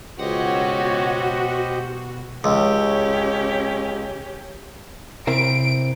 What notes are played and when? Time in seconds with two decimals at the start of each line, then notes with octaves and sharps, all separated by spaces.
0.19 C#2 B2 F#4 G4 C5 C#5 D#5 F#5
2.44 C#2 C#4 G4
5.27 C3 C4 E4 A#4 D7